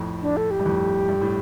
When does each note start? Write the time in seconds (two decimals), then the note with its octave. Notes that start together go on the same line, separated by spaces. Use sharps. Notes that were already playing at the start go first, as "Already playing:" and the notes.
Already playing: F2 A2
0.22 D4
0.37 A4
0.51 G4
0.59 G2
0.65 F2 A2
1.09 G2
1.21 A2